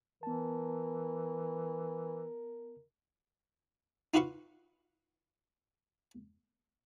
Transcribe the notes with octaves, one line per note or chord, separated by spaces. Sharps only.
E3 B3 A#4 A5
D#4 F4 F#4 B4 F5 C#6